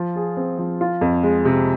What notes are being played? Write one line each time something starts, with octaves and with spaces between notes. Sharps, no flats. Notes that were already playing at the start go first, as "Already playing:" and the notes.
Already playing: F3 F4
G#4
C4
F3
F4
F2
G#3
C3